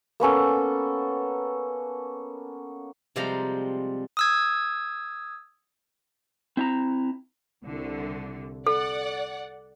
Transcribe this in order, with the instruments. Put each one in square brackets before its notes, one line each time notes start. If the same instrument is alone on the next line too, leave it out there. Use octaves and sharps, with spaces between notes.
[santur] A#3 B3 C#4 A4
[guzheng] C3 F3 G3 G#3 C5 A#5
[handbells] D#6 E6 G#6
[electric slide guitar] C4 E4 A5 A#5
[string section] C2 D3
[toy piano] A4 [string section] D5 F#5